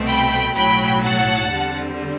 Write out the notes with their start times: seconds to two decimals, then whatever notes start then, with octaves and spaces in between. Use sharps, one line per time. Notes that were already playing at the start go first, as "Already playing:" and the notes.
Already playing: C2 B2 A3 C4
0.09 G5 B5
0.57 B1 A2 F#3 G5 B5
1.05 F#5 A5
1.52 E2 D3 G3 C4